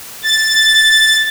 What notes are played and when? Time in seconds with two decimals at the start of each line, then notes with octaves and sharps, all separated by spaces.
0.24 A6